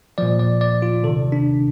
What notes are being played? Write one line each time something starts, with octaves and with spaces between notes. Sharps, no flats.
A#2 F3 D5
D5
D5
F4
C3 D#3 A4
D4